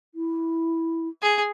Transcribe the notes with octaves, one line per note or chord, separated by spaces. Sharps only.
E4
G#4